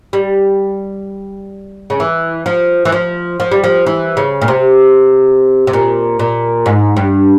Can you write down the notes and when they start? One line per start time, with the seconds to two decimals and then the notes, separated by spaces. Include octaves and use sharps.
0.13 G3
1.90 C#3
2.00 E3
2.46 F3
2.85 E3
2.92 F3
3.40 F3
3.52 G3
3.64 F3
3.86 E3
4.17 C#3
4.42 A#2
4.48 C3
5.67 C3
5.73 A#2
6.19 A#2
6.66 G#2
6.97 G2